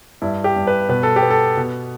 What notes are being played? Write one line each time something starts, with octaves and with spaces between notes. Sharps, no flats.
G2 E4
G4
G2
B4
B2 B4
A4
G4
B3
A4
B2